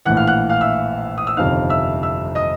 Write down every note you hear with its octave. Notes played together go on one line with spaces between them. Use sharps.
A#1 A2 E3 F#5 F#6
F5 F6
F#5 F#6
F5 F6
E5 E6
D#6
E6
G1 F2 C3 D#3 F5 F6
E5 E6
E5 E6
D#5 D#6